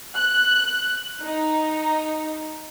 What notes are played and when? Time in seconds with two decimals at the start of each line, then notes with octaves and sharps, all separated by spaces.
0.16 F#6
1.22 D#4